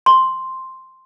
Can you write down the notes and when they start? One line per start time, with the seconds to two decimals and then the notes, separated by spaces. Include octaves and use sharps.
0.06 C6